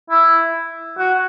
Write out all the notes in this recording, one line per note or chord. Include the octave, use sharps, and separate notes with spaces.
E4
F#4